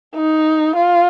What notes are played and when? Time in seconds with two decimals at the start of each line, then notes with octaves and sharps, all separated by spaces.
0.15 D#4
0.76 F4